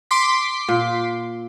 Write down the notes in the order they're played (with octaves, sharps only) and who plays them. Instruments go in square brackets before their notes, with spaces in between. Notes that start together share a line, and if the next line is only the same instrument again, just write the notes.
[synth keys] C6 D6 B6
[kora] A#2